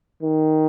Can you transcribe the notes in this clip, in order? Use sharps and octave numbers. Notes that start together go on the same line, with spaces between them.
D#3